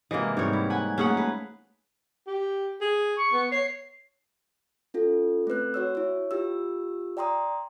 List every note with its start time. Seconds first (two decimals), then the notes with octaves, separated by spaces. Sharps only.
0.11 G#2 C3 E3 A#3 D#5
0.37 G#2 G3 C4 D#4 C#5
0.53 E4
0.70 F#5 G#5 B5
0.98 A3 A#3 C#4 G#4 F#5
1.17 B4
2.27 G4
2.81 G#4
3.17 C#6
3.33 B3
3.52 C#5 C7
4.94 C#4 F4 A4
5.47 A3 C4 B4 F#6
5.74 F#4 C#5 E6
5.95 E4 C#5
6.31 F4 G4 E6
7.17 D5 G5 A#5 C6 D#6